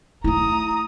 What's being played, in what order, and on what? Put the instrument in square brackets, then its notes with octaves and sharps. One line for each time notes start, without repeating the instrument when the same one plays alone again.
[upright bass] A3 E4 [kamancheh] A#5 D#6